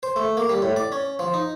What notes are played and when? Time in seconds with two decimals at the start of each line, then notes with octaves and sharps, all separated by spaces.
0.03 C5
0.16 A3
0.37 A#3
0.49 G3
0.62 A2
0.76 D5
0.92 C#4
1.19 F3
1.34 D#4